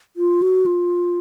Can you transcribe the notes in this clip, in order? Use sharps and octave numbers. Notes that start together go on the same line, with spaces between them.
F4
F#4
F4